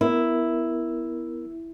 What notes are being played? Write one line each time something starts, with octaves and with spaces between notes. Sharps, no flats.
B3 E4 A#4